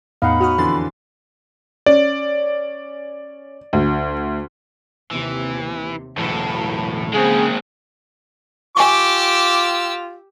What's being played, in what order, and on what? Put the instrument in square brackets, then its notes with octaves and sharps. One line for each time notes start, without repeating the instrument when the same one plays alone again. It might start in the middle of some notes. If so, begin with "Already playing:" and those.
[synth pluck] E2 A2 B3 [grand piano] D#4 [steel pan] F5 F#5 [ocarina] B5
[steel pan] F#4 [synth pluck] C#5 D#6 F6
[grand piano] F2 D3 E3 [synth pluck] C6 A6
[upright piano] C#4 [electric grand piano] D5
[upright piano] D2
[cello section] D#2 C3 [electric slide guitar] E3
[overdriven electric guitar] B1 E2 [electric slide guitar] A2 A4 [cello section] E4 F#4
[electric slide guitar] C#3 C#4 [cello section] F3 A#3 [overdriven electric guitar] G#3 C4 [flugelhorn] G#4
[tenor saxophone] F4 [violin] G4 E6 [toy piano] G#5 C#6 [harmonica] D6